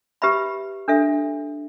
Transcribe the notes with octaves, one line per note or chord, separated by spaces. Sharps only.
G4 B4 E5 B5
D4 A4 E5